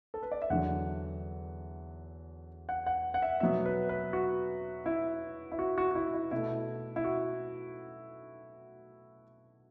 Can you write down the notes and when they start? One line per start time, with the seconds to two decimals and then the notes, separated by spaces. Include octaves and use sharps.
0.14 A4
0.23 B4
0.32 D5
0.42 E5
0.50 E2 D3 F#3 F#5
2.69 F#5
2.86 F#5
3.14 F#5
3.22 E5
3.40 B2 F#3 B3 E5
3.65 B4
3.89 B4
4.13 F#4
4.86 E4
5.52 E4
5.59 F#4
5.78 F#4
5.91 F#4
5.95 E4
6.14 E4
6.31 B2 A3 E4
6.96 E4
7.04 F#4